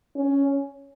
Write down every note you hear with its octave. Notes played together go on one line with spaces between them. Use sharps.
C#4